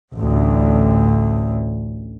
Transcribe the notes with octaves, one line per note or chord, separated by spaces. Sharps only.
A1 D2